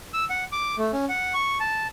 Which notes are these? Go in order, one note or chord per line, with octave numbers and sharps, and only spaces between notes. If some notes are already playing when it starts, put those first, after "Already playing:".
E6
F#5
D6
A3
C#4
F#5
C#6
A5